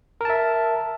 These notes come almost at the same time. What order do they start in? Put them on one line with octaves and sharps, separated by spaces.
A#4 A5 E5